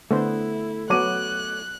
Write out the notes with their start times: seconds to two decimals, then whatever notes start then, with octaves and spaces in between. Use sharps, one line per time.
0.11 D3 A3 B3 E4 C5
0.90 F#3 B3 C#5 D6 F#6 D#7